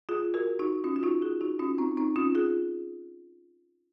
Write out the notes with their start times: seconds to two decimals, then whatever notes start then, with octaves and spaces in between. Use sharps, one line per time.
0.09 F4 G#4
0.34 F#4 A#4
0.59 D#4 F#4
0.84 C#4 F4
0.96 F4
1.03 D#4 F#4
1.22 F4 G#4
1.41 D#4 F#4
1.59 C#4 F4
1.78 C4 D#4
1.97 C4 D#4
2.16 C#4 F4
2.35 F4 G#4